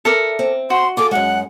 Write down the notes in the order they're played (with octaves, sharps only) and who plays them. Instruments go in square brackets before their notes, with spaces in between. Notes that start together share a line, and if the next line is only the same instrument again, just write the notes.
[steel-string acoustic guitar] E4 [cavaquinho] A4 A#4 D5
[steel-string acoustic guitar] C4
[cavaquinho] F#4 [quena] C6
[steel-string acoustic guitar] F4 G#4 A4 [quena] D6
[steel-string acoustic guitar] F#2 G#3 [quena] F#5